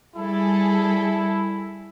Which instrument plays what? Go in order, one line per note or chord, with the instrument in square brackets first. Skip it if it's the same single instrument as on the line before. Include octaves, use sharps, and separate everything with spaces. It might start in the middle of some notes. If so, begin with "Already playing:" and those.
[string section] G3 G#4 A4 [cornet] E4